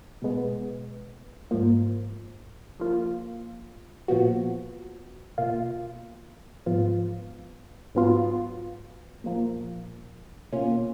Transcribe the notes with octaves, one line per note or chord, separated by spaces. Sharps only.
B2 G#3 B3
G#2 F3 A#3
F3 A#3 F4
A#2 F3 B3 F#4
B2 A#3 F4
G#2 F3 B3 F4
G#2 F#3 B3 F4
A#2 F3 A#3
B2 A#3 C#4 F4